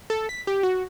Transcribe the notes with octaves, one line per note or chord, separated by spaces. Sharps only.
A4
B6
G4
F#4